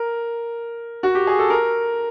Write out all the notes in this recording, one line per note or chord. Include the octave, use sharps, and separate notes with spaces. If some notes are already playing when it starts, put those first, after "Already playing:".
Already playing: A#4
F#4
G4
G#4
A4
A#4